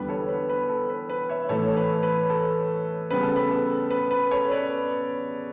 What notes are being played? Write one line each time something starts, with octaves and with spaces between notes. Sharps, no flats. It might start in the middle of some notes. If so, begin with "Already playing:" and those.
Already playing: E2 D3 G3 B3 B4
A4 C#5
B4
B4
A4
B4
B4
C#5 E5
A2 E3 A3 A4 C#5
A4
B4
B4
A4
C#3 G3 B3 B4
A4
B4
A4
B4
B4
A4 C#5
B4 D5